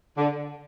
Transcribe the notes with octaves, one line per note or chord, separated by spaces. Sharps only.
D3